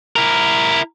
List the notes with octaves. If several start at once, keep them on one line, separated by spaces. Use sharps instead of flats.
E4 A#4